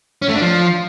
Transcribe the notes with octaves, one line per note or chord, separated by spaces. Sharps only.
C#4
A3
D4
F3